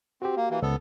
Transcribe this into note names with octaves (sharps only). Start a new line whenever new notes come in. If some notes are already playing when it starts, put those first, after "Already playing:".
C4 F#4 G4
A#3
E3 A#3
C#2 B3 A4